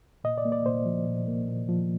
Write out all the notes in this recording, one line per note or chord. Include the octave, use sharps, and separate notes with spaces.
A#2 D#5
D5
A#3
D5
A#2 C5
F3
A#2
A#3
A#2
F3